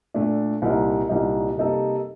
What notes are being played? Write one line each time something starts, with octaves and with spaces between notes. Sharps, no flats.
A#2 A3 D4
C2 A#2 G3 A#3 D#4
C2 A#2 G3 A#3 D#4
C3 G3 A#3 D#4 A4